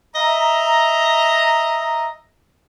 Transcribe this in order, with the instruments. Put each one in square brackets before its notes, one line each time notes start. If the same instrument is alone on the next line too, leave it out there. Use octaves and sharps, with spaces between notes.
[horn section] D#5 E5 A#5